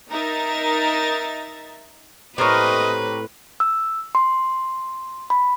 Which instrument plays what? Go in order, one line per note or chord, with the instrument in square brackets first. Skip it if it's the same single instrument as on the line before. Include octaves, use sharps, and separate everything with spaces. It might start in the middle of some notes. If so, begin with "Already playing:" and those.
[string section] D#4 A#4 E5 A#5 A6
[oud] A2 C4 [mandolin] G4 A#4 C#5 [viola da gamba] B4 [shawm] D#5
[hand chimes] E6
C6
B5